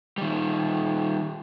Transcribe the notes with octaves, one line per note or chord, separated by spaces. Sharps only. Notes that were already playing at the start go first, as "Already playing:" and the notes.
D#3 G3